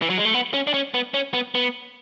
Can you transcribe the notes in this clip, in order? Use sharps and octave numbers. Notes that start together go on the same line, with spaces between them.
E3
F#3
G#3
A3
B3
C#4
D4
C#4
B3
C#4
B3
B3